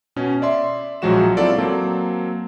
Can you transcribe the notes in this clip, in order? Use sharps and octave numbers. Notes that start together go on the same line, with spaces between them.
B2 C#4
D5 E5 C6
A#1 F3 F#3 G#3 F#4 E7
C4 E4 F4 A4 D5
F#3 A#3 C4 A5